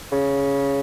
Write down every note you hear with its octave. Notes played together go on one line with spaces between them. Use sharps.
C#3